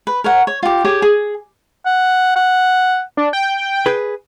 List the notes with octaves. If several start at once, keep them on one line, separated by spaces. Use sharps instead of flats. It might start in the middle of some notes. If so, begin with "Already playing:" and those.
B4
A#4 C#5 F#5
C#5
F4 G4
G4 G#4 C#5
G#4
F#5
F#5
D4
G5
G#4 B4